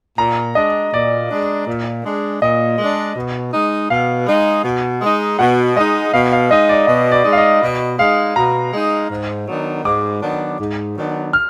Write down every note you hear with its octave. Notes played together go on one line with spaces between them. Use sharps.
A#2 A#5
G#3 D4 D#5
A#2 D5
G#3 D4
A#2
G#3 D4
A#2 D#5
G#3 D4
B2
G#3 D#4
B2 F5
G#3 D#4
B2
G#3 D#4
B2 F#5
G#3 D#4 D#5
B2 F5
F5
G#3 D#4 D#5
D5
B2 D#5
D5
G#3 D#4
F5
D#5
B2
G#3 D#4 F5
B2 A#5
G#3 D#4
G#2
D#3 F#3 B3 D4
G#2 D6
D#3 F#3 B3 D4
G#2
D#3 F#3 B3 D4
F6